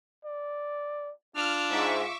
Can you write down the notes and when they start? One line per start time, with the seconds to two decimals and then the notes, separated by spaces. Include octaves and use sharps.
0.25 D5
1.36 D4 F4 F6
1.71 G#2 E5 C#6 D6